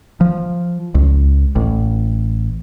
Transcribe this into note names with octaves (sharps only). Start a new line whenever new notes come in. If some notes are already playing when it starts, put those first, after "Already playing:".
F3
C#2
A1